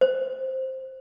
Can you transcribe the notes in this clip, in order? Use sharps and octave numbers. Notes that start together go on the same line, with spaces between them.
C5